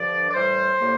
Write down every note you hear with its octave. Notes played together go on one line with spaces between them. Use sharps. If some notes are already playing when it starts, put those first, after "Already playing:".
Already playing: G2 D3 F3 D5
D5
A2 E3 G3 C5
A2 G3 A#3